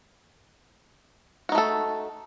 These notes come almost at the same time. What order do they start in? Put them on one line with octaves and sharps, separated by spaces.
F#4 D#4 A3 A4